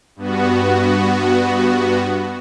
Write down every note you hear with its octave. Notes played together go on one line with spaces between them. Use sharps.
G2 B3 F#4